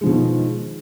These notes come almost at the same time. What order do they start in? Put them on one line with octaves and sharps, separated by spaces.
G#3 F3 B2 D#3